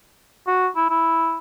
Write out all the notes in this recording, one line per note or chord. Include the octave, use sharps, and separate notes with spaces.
F#4
E4
E4